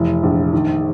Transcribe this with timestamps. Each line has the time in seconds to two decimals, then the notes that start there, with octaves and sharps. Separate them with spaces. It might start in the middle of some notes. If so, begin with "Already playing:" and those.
Already playing: F1 E3
0.23 A#1
0.53 D#3